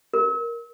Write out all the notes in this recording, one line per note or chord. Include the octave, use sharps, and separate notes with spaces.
A#4